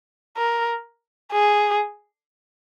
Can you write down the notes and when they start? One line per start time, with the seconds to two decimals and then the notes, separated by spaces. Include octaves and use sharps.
0.37 A#4
1.32 G#4